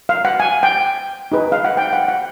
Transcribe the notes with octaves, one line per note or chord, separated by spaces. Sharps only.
F5
F#5
G#5
G5
D#4 G#4 B4
F5
F#5
G5
F#5
F#5